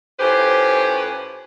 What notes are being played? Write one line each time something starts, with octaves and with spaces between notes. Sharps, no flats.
A2 C#4 F4 G4 B4 C5